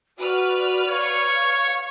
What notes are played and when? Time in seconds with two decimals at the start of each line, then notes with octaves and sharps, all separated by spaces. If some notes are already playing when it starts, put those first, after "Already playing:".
0.19 F#4 B4 D5 F6
0.89 C#5 F5 C#6